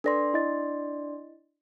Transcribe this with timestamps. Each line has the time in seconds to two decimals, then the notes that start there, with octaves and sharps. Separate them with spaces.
0.04 D4 A4 B4 D5 C6 A#6
0.34 E4 D#5 A6